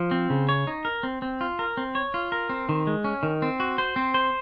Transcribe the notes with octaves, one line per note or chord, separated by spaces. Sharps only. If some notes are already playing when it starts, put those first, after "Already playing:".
Already playing: F3
C4
C#3
C#5
D#4
A#4
C4
C4
F4
A#4
C4
C#5
F4
A#4
C4
D#3
G#3
C#4
D#3
C4
F#4
C5
C4
C5